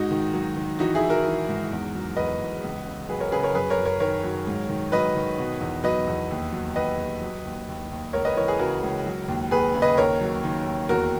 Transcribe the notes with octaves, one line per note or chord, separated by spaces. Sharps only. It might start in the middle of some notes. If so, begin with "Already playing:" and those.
Already playing: G#2 D#4 F#4
D#3
F#3
D#3
E3 D#4 F#4
E4 G#4
E3
F#4 A#4
E3
G#2
E2
F#3
E2 B4 D#5
E2
C#2
C#3
F#3 G#4 B4
A#4 C#5
C#3 G#4 B4
A#4 C#5
F#2 G#4 B4
A#4 C#5
F#2
A#4 C#5
D#3 A#4 C#5
F#3
G#2
D#3
F#3 B4 D#5
D#3
B2
E2
F#3 B4 D#5
E2
D#2
F#3
D#2 B4 D#5
D#2
F#3
D#2
D#2
D#2
C#2 A#4 C#5
B4 D#5
E3 A#4 C#5
G#4 B4
C#3 F#4 A#4
C#2
F#3
D#2
D#2 G#4 B4
C#3
B4 D#5
D#2 A#4 C#5
F#3
D#3
D#2
E2 F#4 A#4